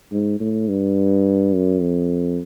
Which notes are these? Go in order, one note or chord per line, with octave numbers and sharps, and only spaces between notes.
G#2
A2
G2
F#2
F2